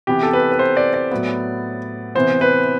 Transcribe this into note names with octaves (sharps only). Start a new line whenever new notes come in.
C3 E3 B3 G4
A4
B4
B4
C5
D5
D5
A2 F#3 B3
C3 E3 B3 C5
B4